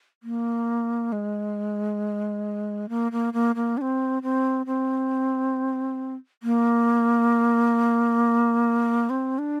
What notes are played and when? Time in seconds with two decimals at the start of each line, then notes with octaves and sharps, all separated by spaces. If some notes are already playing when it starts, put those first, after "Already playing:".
0.23 A#3
1.12 G#3
2.89 A#3
3.12 A#3
3.33 A#3
3.55 A#3
3.77 D4
3.81 C4
4.23 C4
4.66 C4
6.43 A#3
9.10 C4
9.38 D4